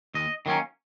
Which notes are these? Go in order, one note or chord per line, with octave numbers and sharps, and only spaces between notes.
D#2 D#5
D#3 F#3 A#3 C#4